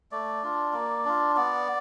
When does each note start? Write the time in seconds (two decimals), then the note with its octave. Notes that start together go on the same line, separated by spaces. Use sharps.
0.12 A3 D5
0.43 D4 F4
0.73 A#3
1.05 D4 F4
1.36 B3 D5